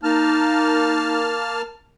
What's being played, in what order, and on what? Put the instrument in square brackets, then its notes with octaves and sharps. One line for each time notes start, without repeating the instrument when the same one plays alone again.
[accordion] A#3 A5 F6 [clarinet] D#4